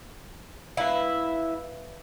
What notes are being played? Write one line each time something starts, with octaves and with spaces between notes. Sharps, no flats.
E4 B4 F5